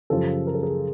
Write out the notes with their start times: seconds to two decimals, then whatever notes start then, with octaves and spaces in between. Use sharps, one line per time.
0.10 F#2 C#3 F3 G4 A4
0.47 A#4
0.55 A4
0.63 G#4 A#4